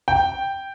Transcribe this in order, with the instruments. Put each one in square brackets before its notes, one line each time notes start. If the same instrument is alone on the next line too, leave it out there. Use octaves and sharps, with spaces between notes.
[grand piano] G5